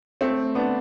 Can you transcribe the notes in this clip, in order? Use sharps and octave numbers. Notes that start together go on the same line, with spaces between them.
A3 C4
B3 D4